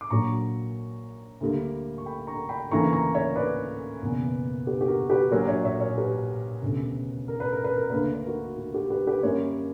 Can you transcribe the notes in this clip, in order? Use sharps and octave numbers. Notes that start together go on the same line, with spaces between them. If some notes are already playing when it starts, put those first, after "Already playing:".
D6
A#1 A#2 F#3 A#3 A#5 C#6
D2 D3 G3 A#3
C#6
G5 B5
A#5 C#6
G5 B5
D2 C#3 E3 A#3 A#5 C#6
A#5 C#6
C#5 E5
B4 D5
F#1 E2 B2 A#3
G4 B4
G4
F#4 A#4
G4 B4
A#1 A#2 F#3 A#4 C#5
C#5 E5
C#5 E5
A#4 C#5
G4 B4
E1 D2 C#3
A#4
B4
A#4
B4
A#4
D2 D3 A#3 B4
A#4
B4
F#4 A#4
F#4
G4
G4 B4
G4 B4
F#2 D3 G3 A#3 A#4 C#5